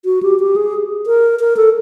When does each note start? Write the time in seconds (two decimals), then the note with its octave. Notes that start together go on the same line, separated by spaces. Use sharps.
0.05 F#4
0.23 G4
0.40 G4
0.56 G#4
1.07 A#4
1.40 A#4
1.57 A4